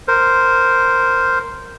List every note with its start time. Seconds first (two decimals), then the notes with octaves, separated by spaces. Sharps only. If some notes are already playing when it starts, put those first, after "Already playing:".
0.08 A#4 C5